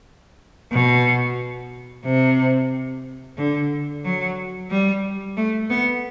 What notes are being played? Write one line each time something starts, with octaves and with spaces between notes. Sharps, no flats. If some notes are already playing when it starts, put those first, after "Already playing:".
B2
C3
D3
F#3
G3
A3
B3